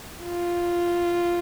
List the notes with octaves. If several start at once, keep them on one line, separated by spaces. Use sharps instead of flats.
F4